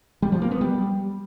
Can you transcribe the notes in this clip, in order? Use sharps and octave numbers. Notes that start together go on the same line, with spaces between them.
G3
F3
A#3
B3
G3